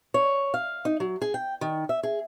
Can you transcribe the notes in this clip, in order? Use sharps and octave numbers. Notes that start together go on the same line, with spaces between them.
C#5
F5
D#4
F#3
G#4
G5
D#3
E5
G#4